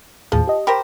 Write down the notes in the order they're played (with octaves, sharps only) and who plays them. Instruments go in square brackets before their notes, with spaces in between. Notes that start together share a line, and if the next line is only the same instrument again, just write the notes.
[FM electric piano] D#2 A2 G#4 [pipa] F3
[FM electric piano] G4 D#5
[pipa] G4 A#4 C5 [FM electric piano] B5